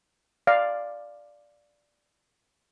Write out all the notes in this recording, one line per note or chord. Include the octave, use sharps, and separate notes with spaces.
D5 F5